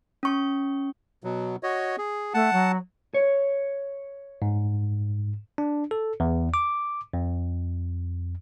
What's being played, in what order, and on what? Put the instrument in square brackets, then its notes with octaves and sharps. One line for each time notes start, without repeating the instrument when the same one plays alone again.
[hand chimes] C#4 C#6
[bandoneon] B2 F#3
F#4 C#5 D#5
G#4
[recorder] A3 [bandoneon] F#5 A5
[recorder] F#3
[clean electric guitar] C#5
[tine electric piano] G#2
D4
A4
E2
D6
F2